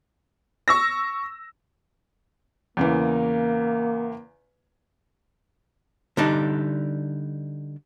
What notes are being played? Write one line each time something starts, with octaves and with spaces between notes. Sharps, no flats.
C#6 E6 A#6
E2 C#3 E3 A#3
D3 G3 D4 D#4